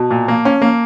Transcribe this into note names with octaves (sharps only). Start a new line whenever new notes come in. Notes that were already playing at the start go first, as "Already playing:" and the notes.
Already playing: B2 A5
A#2
A#3
C#4
A#3